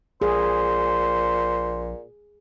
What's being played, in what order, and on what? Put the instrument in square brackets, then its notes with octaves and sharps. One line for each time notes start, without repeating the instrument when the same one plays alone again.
[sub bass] A#1 [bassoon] A#2 [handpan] G#4 [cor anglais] C5